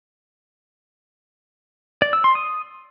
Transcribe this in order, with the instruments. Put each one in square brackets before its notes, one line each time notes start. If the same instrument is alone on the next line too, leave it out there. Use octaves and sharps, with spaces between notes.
[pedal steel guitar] D5
E6
C6
D#6